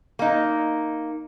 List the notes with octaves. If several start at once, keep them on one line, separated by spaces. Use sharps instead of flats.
A#3 D#4